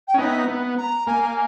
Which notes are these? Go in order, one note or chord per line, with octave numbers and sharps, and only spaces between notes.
G5
C#4
B3 D#4 E5
B3
A#5
A#3 G#5